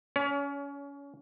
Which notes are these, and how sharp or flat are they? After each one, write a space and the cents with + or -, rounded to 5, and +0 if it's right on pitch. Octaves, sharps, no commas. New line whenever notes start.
C#4 +25 C#5 +40